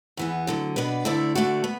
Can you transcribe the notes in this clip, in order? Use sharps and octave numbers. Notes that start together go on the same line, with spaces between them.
E2 E3 B3
D2 D3 F#3
B2 B3 D4 B4 D5
D2 D3 A3 E4 D5
D3 A3 F#4 D5
B3